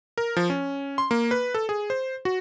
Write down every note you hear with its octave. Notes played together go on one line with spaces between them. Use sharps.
A#4
F3
C#4
C6
A#3
B4
A4
G#4
C5
F#4